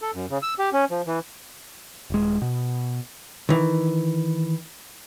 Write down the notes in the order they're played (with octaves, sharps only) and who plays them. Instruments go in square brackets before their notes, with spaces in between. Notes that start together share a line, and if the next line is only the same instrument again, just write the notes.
[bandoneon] A4
F#2
C#3
E6
G4
C#4
F3
E3
[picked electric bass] D#1 G#3
B2
[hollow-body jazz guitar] D#3 E3